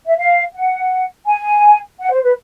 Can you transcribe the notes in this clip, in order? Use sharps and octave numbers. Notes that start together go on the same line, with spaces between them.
E5
F5
F#5
G#5
F#5
C5
B4